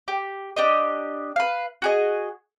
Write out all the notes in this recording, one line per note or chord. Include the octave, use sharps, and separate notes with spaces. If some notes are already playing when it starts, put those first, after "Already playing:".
G4
D4 G4 D#5
B4 F5
F#4 G#4 D#5